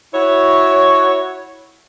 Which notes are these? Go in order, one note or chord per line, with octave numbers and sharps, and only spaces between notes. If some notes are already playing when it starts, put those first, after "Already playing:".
E4 F#4 C#5